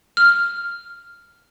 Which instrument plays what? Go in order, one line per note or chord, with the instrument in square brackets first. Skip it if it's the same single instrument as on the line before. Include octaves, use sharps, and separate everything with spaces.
[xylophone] F6